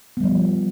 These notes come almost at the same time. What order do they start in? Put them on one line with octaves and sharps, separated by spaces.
B3 G3 F3